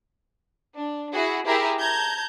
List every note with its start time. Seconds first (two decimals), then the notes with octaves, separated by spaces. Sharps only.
0.76 D4
1.12 E4 F#4 G#4
1.46 E4 G4 G#4 A#4 E5
1.79 A5 A#5 G6 G#6